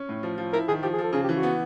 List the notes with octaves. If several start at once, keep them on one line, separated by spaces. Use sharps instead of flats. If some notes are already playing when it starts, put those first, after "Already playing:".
Already playing: C#4
A2
F3
F3
E4 A#4
D#3 G#4
F3 G4
G#4
F3 A4
C#3 G#4
G4
E3 F#4
B3